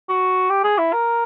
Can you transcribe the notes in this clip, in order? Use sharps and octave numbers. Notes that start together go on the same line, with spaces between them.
F#4
G4
G#4
E4
A#4